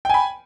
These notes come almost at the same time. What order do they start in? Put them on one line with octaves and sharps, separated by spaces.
G5 G#5 B5